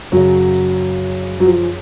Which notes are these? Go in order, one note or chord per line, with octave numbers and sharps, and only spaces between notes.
F#2 C#3 F#3
F#3
F3